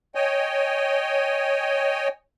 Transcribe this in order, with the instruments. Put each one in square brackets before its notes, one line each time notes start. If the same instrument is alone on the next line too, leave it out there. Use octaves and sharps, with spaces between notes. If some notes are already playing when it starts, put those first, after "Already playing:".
[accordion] C#5 D#5 G5 G#5